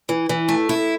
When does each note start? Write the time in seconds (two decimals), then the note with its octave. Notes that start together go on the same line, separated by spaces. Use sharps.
0.09 E3
0.29 E3
0.49 A3
0.69 E4